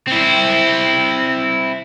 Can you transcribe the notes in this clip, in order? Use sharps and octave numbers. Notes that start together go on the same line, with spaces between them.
C4 E4